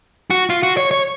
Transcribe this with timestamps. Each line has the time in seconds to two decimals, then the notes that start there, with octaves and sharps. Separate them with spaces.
0.30 F#4
0.50 F4
0.63 F#4
0.77 C#5
0.91 C#5